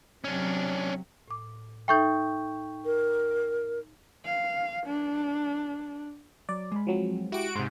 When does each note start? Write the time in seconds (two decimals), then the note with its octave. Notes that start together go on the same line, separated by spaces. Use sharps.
0.24 C3 F#3 C#4 D4
1.28 A2 D6
1.88 D#4 A4 E5 G5 C#6 G6
2.85 A#4
4.25 F5
4.87 D4
6.49 F#3 D5
6.72 G#3 B5
6.87 F3 F#3 C4
7.32 E4 F#4 G4 D7
7.56 G#2 C3 C6